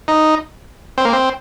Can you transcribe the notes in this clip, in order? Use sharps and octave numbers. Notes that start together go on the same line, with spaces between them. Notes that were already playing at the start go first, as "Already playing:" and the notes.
D#4
C4
A#3
C4